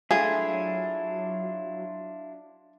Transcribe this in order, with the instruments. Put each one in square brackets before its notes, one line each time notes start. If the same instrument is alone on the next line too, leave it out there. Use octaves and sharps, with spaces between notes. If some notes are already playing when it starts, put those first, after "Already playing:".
[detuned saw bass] F#3 [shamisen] A3 F5 [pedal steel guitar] D4 E4 F4 [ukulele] G#4